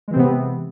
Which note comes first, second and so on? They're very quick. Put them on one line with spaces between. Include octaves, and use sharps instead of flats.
G#3 E3 C4 C3 B3